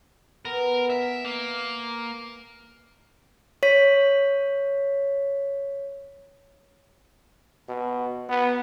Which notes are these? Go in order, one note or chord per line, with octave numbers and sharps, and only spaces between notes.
B3 A#4
E5 G#5 A#5
A#3
C#5 B6
B2
B3